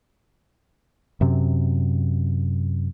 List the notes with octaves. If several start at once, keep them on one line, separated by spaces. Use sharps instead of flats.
F#2 C3